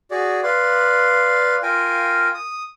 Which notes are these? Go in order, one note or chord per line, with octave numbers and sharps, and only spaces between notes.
F#4 G#4 D5
B4 D5 F5 C6
F4 A#4 F5 G5 G#5
D#6